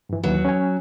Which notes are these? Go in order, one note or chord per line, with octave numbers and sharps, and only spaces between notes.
G2 E3
D#2 E3 F#3 B4
C#4 G#5